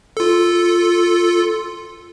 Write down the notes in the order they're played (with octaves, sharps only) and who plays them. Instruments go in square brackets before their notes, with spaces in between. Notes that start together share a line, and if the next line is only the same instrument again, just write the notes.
[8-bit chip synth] F4 A4